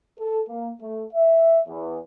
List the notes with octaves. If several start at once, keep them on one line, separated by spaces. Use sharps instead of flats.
A4
A#3
A3
E5
E2